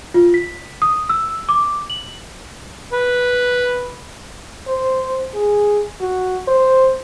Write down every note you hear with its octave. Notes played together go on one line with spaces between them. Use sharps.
F4
B6
D#6
E6
D6
F#7
B4
C5
G#4
F#4
C5